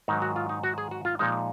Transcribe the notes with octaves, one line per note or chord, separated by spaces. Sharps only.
G#2 D#3 F#3 D#4
F#4
F4
D#4
F#4
G#4
F#4
F4
A#2 F3 G#3 D#4